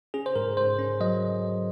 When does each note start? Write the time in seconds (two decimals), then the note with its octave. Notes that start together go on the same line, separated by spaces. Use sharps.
0.14 C#4 G#4
0.26 C5
0.36 G#2 A#4
0.57 G#2 C5
0.79 C#4
1.00 F#3 D#5